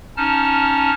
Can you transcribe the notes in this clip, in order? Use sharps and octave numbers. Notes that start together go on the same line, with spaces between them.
C#4 D#4 A5 F6